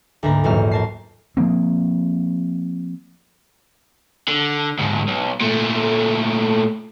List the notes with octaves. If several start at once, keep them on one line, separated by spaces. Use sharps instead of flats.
D2 G#2 A#3 B4 A#5
A#1 E2 G#2 F#3 F6
A#4 A5 C7
F3 A#3 C4
D3
D2 G#2
B1
A#2 A3